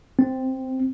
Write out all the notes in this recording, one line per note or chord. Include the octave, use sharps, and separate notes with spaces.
C4